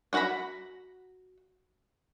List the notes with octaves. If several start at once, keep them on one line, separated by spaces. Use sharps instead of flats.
D4 F#4 F#5 A#5 B5